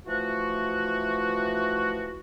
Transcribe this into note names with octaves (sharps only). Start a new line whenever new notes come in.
E3 F3 A3 F#4